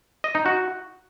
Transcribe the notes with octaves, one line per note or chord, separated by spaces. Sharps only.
D#5
D#4
F#4